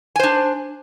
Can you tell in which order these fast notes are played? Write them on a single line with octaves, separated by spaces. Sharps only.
G#5 C5 D4